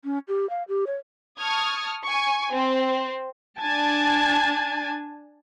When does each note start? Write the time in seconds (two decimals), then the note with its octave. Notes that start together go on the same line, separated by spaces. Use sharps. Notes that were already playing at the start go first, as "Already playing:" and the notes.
0.05 C#4
0.28 G4
0.50 F5
0.68 G4
0.87 C#5
1.39 A5 C#6 D#6 F6 G#6
2.05 G#5 C#6
2.52 C4 C5
3.59 D4 G#5 A5